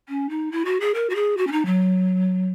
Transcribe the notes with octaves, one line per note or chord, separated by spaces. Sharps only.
C#4
D#4
E4
F#4
G#4
A#4
F#4
G#4
F#4
C#4
D#4
F#3